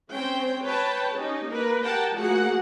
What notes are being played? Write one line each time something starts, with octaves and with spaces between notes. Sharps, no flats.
C4 C#4 C5 G5
B4 C#5 G5 A5
C#4 D#4 G4
A#3 A#4 B4
G4 A#4 F#5 G5 A5
F3 A3 A#3 F#4 G#4 F#5